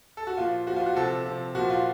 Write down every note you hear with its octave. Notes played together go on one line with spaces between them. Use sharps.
A4
F#4
A#2 F3 F4
A#2 F3 F#4
F4
F#4
C3 F3 A4
C3 F3
A#2 F3 F#4
F4